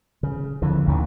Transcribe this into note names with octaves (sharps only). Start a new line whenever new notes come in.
C#3
F2 D3 E3
A1 D#2 D#3